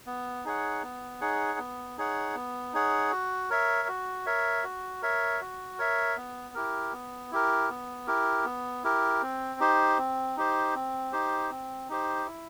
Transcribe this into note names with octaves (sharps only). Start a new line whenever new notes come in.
B3
D#4 G#4 C#5 F#5
B3
D#4 G#4 C#5 F#5
B3
D#4 G#4 C#5 F#5
B3
D#4 G#4 C#5 F#5
F#4
A#4 C#5 E5
F#4
A#4 C#5 E5
F#4
A#4 C#5 E5
F#4
A#4 C#5 E5
B3
E4 G4 A#4
B3
E4 G4 A#4
B3
E4 G4 A#4
B3
E4 G4 A#4
C4
D#4 G4 C5
C4
D#4 G4 C5
C4
D#4 G4 C5
C4
D#4 G4 C5
E4